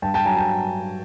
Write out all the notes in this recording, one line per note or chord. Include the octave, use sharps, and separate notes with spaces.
G2 G5 A5
G5 A5
F#3 G#5 A#5
G5 A5